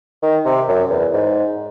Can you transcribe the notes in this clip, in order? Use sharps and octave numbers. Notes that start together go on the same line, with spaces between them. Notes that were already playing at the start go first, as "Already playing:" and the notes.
D#3
C3
F#2
E2
G#2